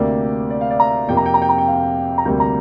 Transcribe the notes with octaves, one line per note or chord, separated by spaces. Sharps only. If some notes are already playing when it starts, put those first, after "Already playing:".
Already playing: D2 C3 A#3 D5
D5
F5
D5
A#5
F2 C3 A#3 G5
A#5
G5
A#5
G5
A#5
G5
F5
A#5
D2 C3 G3 A#3 G5
A#5